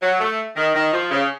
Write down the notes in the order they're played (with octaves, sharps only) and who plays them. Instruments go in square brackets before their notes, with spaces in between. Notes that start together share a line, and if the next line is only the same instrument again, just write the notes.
[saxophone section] F#3
A3
D#3
D#3
F3
C#3